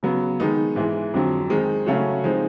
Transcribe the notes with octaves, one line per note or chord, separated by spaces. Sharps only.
C#3 F#3 B3
D#3 G#3 B3 D#4
G#2 E3 G#3
F2 D3 F#3
D#3 G#3 C4 D#4
C#3 F#3 A3 C#4 F#4
F3 G#3 C4 D#4